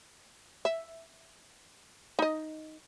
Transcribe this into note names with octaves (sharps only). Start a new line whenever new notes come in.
E5
D#4 D#5